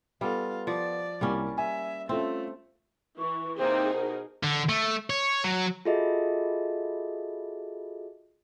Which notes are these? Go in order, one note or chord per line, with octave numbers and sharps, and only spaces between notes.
G3 B3 F4 A4
F3 D5
C2 G3 A#3 C#4
E5 G#5
A3 C4 C#4 F4 A4
E3 C#6
C3 A#3 C4 D#4 G#4 C5
B2 A#4
D3
A3
C#5
F#3
F4 F#4 G#4 A4 D#5 E5